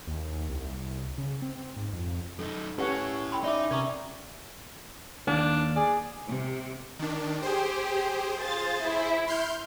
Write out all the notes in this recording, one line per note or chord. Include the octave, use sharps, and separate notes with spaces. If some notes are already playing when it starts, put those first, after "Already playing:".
D#2
C2
C#3
C4
G#2
F2
F#2 D#4 A4
C#4 E4 G4 A4 B4 C#5 F#5
G5 B5 C6
D#4 D5 E5 D6
C3 C#4 A#4 A#5 C#6 D#6 G#6
D#2 A#3 D4
G#4 D5
C3
D#3 D4
G4 G#4 C5
F4 A6
E4
C6 F6 G6